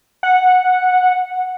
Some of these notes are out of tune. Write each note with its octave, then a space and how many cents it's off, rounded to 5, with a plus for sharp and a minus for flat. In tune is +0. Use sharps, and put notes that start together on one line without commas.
F#5 -5